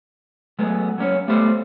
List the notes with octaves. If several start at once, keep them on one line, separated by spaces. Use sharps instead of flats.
F#3 G#3 A3 B3
F#3 A#3 C#4 C#5
G3 A3 B3 A4 C5